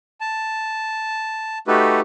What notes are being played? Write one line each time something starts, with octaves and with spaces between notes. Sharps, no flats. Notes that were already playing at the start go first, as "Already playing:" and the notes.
A5
A3 D#4 F#4 G4 A4 B4